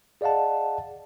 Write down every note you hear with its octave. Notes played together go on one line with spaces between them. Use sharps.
G#4 D5 D#5 F5 F#5 A5